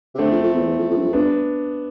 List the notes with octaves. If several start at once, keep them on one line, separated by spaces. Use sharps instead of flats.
C3
D3 A3 C4
F2
F2
E2
E2
F2
F2
G2
F2
G2 B3 D4